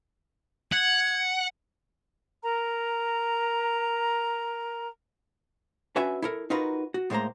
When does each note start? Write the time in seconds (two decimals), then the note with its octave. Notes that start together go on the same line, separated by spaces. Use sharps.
0.72 F#5 G#6
2.44 A#4 A#5
5.96 C#4 D4 F#4 B4 E5 G#5
6.22 E4 A4 A#4
6.50 D#4 F4 F#4 A#4 B4
6.94 F#4
7.10 A2 G#3 A#3 C5 A#5